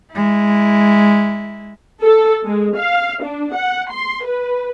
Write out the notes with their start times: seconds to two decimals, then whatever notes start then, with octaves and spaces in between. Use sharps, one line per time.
0.13 G#3 E4
2.02 A4
2.45 G#3
2.76 F5
3.23 D4
3.53 F#5
3.90 C6
4.23 B4